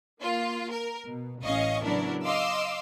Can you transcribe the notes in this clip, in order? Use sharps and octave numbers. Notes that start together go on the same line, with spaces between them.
A#3 F4
A#4
B2
A1 C#4 D#5 F5 C#6
C#3 F#3 B3 D4 E4 A#4
D#5 F5 C6 D6 E6